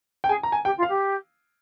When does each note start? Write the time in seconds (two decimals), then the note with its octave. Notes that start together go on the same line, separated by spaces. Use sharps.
0.24 G5
0.28 G#4 G#5
0.43 A#5
0.52 G#5
0.65 G4 G5
0.77 F4
0.83 F5
0.88 G4